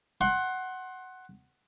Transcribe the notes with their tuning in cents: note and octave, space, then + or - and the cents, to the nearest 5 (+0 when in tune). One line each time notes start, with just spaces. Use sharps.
F#5 +10 C6 +25